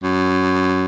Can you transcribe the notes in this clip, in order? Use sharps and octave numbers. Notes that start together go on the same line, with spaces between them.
F#2